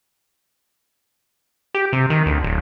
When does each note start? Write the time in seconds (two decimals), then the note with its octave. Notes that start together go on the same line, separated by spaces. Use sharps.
1.74 G4
1.93 C3
2.10 D#3
2.26 D2
2.43 D1